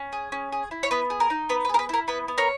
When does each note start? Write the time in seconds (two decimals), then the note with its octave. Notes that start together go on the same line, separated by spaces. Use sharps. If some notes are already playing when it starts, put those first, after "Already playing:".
Already playing: C#4
0.13 G#4
0.32 C#4
0.52 G#4
0.71 E4
0.83 C#5
0.91 B3 B4
1.10 G#4
1.20 A#4
1.30 D#4
1.49 B3 B4
1.65 B4
1.69 G#4 A#4
1.79 B4
1.89 E4 A#4
2.08 B3 B4
2.28 B3
2.38 A#4 C#5